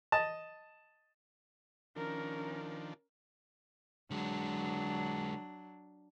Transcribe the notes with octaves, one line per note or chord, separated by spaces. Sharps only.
D#5 A5
D#3 F3 C#4 D4 A#4
D3 F#3 G#3 D4